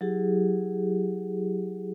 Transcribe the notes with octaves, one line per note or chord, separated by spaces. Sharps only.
F#3 E4 G4 G#4